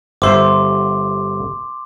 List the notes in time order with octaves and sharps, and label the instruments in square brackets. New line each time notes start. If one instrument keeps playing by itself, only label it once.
[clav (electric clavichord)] G1 C5 E5 [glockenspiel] C6 D6